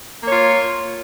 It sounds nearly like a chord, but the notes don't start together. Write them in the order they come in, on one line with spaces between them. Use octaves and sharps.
A#3 C#5 F4